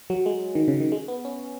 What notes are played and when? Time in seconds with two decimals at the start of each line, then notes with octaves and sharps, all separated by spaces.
0.10 F#3
0.26 G#3
0.55 D#3
0.68 C#3
0.80 D#3
0.92 G#3
1.08 B3
1.25 C#4